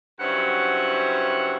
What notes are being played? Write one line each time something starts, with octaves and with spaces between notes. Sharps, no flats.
G2 C#3 F#3 E4 C5 F#5